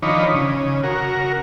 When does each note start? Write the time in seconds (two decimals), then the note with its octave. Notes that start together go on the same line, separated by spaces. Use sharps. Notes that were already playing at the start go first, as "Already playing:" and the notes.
0.03 D#3 F3 D4 D#4 C#5 B5
0.34 C#3
0.83 F#4 A#4